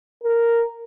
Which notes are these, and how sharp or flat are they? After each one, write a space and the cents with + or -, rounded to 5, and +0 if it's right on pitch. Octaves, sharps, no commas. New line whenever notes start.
A#4 -5